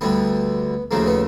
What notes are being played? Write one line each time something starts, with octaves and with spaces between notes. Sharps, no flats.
D2 D3 G3 B3
D#2 C#3 F3 A3 A#3
B3